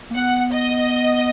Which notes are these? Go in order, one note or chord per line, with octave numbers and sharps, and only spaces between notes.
A#3
B3 F#5
D#5